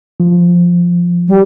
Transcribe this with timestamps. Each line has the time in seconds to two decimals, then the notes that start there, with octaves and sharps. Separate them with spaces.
0.20 F3
1.28 G3